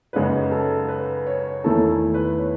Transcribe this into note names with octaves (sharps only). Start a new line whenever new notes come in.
F#2 C#3 G#3 D#4 F#4 B4
A4
B4
C#5
E2 D#3 A3 E4 A4
B4
C#5